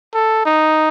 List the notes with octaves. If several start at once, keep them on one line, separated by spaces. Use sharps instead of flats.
A4
D#4